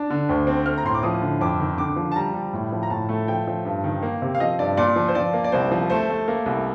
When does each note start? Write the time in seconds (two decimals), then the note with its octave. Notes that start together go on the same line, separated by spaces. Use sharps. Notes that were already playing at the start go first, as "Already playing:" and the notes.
Already playing: D4
0.10 D3
0.29 D2
0.47 C4
0.65 A3 F6
0.78 A#5
0.85 A2 C6
0.94 D6
1.03 F3 D#6
1.22 D3
1.41 F2 D6
1.60 D#3
1.78 D3 D6
1.96 F3
2.12 A5
2.16 G3 A#5
2.34 G3
2.53 A2
2.72 F3
2.83 A#5
2.90 A2 A5
3.09 A3
3.28 F3 G5
3.47 F3
3.65 G2
3.84 D#3
4.03 A#3
4.22 C3
4.35 F5
4.40 F3 D#5
4.59 G2 D5
4.77 A#2 D5
4.96 F3
5.08 C5
5.15 F3 D5
5.33 A#3
5.44 D5
5.52 C2 C5
5.72 F3
5.90 A3 C5
6.10 A3
6.28 A#3
6.46 C2